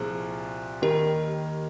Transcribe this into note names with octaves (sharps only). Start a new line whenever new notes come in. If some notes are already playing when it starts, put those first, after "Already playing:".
Already playing: C2 A#2 F3 G#4 C5
D#2 D#3 G3 G4 A#4